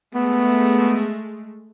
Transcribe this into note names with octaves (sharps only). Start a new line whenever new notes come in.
G#3 A3 B3